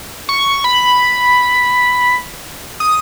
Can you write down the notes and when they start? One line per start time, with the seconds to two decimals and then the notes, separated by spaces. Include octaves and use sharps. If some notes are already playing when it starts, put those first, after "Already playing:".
0.29 C#6
0.64 B5
2.80 D#6